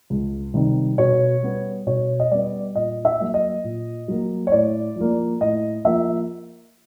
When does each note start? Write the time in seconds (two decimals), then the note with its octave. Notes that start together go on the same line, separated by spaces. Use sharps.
0.10 C#2
0.54 C3 D#3 G3 C4
0.98 B2 C#5
1.43 G3 B3
1.87 B2 C#5
2.20 D#5
2.31 G3 B3 D5
2.75 A#2 D#5
3.05 E5
3.20 F#3 A#3
3.34 D#5
3.64 A#2
4.08 F#3 A#3
4.47 C#5
4.52 A2 D5
4.96 F3 A#3
5.41 A2 D#5
5.85 F3 A#3 E5